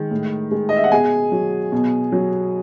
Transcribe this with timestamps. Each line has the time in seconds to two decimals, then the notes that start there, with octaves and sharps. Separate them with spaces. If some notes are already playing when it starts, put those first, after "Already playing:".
Already playing: D#3 G#3
0.11 A2
0.51 G#3
0.69 D#5
0.77 E5
0.84 F#5
0.92 B2 G#4 G#5
1.32 F#3
1.72 B2
2.12 F#3